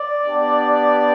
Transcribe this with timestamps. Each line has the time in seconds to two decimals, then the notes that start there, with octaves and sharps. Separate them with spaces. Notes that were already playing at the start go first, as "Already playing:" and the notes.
Already playing: D5
0.24 B3 D4 G4